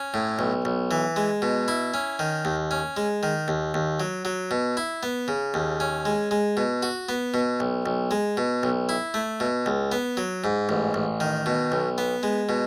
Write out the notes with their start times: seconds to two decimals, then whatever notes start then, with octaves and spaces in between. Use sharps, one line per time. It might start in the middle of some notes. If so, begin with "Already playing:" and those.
Already playing: C#4
0.14 A2
0.39 B1
0.65 B1
0.91 E3
1.16 G#3
1.42 B2
1.68 E4
1.94 C#4
2.19 D#3
2.45 D#2
2.71 C#4
2.97 G#3
3.23 D#3
3.48 D#2
3.74 D#2
4.00 F#3
4.25 F#3
4.51 B2
4.77 E4
5.03 B3
5.28 C#3
5.54 D#2
5.80 C#4
6.05 G#3
6.31 G#3
6.57 B2
6.83 F#4
7.09 B3
7.34 B2
7.60 B1
7.86 B1
8.11 G#3
8.37 B2
8.63 B1
8.89 E4
9.14 A3
9.40 B2
9.66 C#2
9.92 B3
10.17 F#3
10.44 G#2
10.69 A1
10.94 A1
11.20 D#3
11.46 B2
11.72 B1
11.98 B3
12.23 G#3
12.49 B2